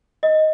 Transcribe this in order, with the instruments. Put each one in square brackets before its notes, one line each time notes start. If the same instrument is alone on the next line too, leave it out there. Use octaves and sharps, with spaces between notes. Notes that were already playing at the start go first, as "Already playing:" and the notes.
[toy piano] D#5